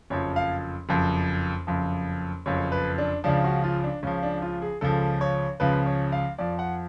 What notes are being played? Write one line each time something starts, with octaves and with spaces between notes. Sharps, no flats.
F#1 F2 F3 C#5
F5
F#1 F2 F3
F#1 F2 F3
F#1 F2 F3 C#5
B4
D4
C#2 C#3 F3 D4
F#4
F4
D4
C#2 C#3 F3 C#4
D4
F4
G#4
C#2 C#3 F3 A4
C#5
C#2 C#3 F3 B4
C#5
F5
F2 F3 D5
F#5